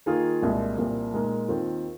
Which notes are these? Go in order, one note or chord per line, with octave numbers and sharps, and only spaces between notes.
D#3 A#3 F4 G#4
C2 A#2 G#3
C2 A#2 F3
A#2 G#3 D#4 A#4
D#2 D#3 C4 F4